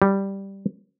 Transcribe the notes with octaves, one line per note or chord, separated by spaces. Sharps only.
G3